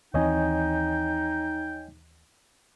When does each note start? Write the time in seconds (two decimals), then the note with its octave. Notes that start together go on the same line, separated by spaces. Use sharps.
0.14 D#2 E3 C4 D#4 C#5 D#5 G5 G#5